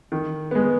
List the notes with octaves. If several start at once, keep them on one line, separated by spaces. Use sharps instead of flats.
D#3
G#3 B3